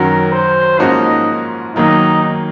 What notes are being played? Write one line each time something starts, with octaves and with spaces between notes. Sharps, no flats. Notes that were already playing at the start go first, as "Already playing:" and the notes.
Already playing: F#2 D#3 F#3 C#4 F#4 A#4
C5
G#2 F3 A#3 C#4 D#4 F#4
D#3 F#3 A#3 D#4